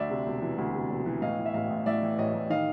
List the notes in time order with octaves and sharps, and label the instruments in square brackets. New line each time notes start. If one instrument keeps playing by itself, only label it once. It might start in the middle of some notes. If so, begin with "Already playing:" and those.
Already playing: [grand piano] D2 D5 E5
C3
E1
E3
D2
C3
E1
E3
A2 D#5 F5
E3
E5
A1 D#5 F5
A1
A2 D5 E5
E3
A1 C#5 D#5
A1
D#3 D#5 F5